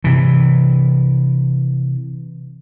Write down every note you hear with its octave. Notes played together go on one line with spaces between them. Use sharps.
C3 E3